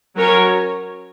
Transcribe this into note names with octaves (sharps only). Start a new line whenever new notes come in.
F#3 C#4 A#4 C#5